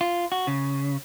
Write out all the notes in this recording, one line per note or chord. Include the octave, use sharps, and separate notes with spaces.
F4
F#4
C#3